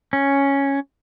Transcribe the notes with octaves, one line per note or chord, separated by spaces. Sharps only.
C#4